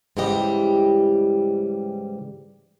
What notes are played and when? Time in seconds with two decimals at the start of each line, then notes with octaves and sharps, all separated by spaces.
0.17 G#2 C#3 E3 G3 G4 D#5